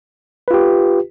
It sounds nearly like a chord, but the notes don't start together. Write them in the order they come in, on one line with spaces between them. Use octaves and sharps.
B4 F4 G4